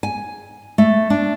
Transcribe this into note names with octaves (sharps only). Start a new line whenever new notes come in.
G#5
A3
D4